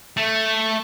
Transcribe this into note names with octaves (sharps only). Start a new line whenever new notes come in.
A3